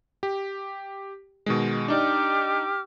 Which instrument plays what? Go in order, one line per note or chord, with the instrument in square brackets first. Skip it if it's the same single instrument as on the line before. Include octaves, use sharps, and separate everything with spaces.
[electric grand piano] G4
B2 D#3 G#3
[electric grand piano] D4 D#4 D5 [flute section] G4 D6 F6